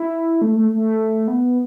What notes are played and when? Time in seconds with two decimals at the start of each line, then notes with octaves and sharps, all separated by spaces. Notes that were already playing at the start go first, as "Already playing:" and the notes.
Already playing: E4
0.42 A3
0.56 A3
0.73 A3
1.28 B3